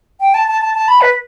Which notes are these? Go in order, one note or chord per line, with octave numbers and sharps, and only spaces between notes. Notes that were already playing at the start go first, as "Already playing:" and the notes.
G5
A5
A5
A5
A5
B5
B4